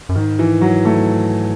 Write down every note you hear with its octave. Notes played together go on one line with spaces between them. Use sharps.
F#2
G#2 D#3
E3
F#3
A3